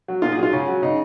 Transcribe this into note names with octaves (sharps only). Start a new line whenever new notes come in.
F#3
A#2 F4
G#4
F#3
F4
C#3 C#4
F#3
C#3 D#4